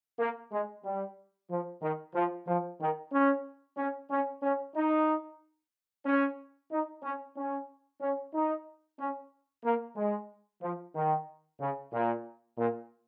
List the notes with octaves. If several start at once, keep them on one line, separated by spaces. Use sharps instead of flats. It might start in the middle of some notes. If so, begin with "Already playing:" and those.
A#3
G#3
G3
F3
D#3
F3
F3
D#3
C#4
C#4
C#4
C#4
D#4
C#4
D#4
C#4
C#4
C#4
D#4
C#4
A#3
G#3
F3
D#3
C#3
A#2
A#2